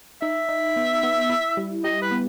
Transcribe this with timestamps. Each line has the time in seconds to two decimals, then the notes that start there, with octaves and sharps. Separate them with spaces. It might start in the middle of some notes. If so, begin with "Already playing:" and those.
0.22 D#4 E5
0.49 D#4
0.76 B3
1.03 B3
1.30 E4
1.57 G3
1.84 G4 D#5
2.02 B4
2.11 B3